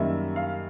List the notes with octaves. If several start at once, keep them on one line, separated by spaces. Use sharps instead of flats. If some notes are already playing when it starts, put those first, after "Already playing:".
Already playing: F#2 D#3 G3 A#3 E5
F5